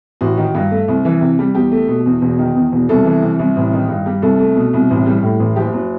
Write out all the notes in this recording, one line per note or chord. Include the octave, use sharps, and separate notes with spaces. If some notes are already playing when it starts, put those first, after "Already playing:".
A1 F#4
D#3
G2
A3
C2
E3
C3
G3
E2 G4
A3
B2
E2
E1
D#3
E2
E1
C2 A4
E3
C3
C2
A1
D#3
G2
G3
C2 A4
A3
B2
C2
A1
G3
A2
A1
F#1 G4
F#3